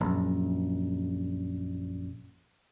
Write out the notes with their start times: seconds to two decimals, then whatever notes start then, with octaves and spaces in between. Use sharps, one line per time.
0.01 A#1 F#2